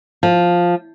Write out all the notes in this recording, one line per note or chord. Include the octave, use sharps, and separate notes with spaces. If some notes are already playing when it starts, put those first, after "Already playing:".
F3